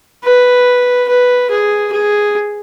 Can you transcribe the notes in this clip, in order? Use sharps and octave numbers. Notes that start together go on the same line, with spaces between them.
B4
B4
G#4
G#4